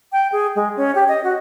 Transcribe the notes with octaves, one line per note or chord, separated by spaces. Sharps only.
G5
G#4
G#3
C#4
G4
D#5
F#4